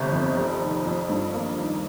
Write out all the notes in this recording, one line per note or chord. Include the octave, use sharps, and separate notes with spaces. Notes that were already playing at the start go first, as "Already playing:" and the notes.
Already playing: G1 C3
F2
F1
D#3
F2
G2
A#3
D#3